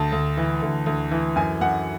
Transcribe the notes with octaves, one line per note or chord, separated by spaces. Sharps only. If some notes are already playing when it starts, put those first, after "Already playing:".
Already playing: D2 A5
D2
E3
D2
D2
E3
F#2 G#5
F#2 F#5